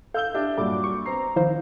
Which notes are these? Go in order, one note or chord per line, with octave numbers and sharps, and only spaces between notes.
A4 F5 E6 G6 G7
D4 G4 E5
G2 A#2 F#3 A4 D6
C#6
B3 C4 A#5 C7
D#3 F3 E4 C5 F5